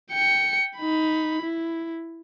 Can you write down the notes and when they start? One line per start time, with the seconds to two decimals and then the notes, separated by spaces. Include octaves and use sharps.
0.11 G5 C#7
0.77 D#4 B5
1.42 E4